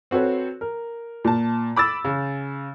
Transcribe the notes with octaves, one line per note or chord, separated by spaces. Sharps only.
C4 F#4 A4 B4 C#5
A#4
A#2 A5
B5 D6 E6 A6
C#3